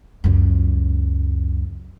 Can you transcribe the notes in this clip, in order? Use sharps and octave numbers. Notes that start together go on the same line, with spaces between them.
C#2 F#2